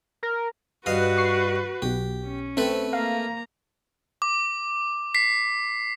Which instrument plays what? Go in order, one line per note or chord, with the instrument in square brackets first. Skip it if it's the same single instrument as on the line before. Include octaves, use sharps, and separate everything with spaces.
[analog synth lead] A#4
[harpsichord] G2 D#5 F5 [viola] F#4 B4
[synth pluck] C#6 C7
[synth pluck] B1 B2 [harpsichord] G4
[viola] C#4
[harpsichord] A3 A4 B4 [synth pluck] C4
[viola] A#3 A#5 [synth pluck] F5
[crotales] D6
B6 C7